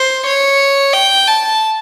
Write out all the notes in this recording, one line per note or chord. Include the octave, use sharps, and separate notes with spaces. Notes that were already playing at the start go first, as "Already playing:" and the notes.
Already playing: C5
C#5
G5
A5